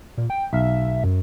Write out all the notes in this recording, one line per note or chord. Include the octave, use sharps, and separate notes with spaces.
A#2
G5
B1 E5 F5
F#2